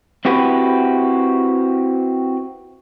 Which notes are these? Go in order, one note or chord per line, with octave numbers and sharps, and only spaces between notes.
C4 E4 F#4 G4 B4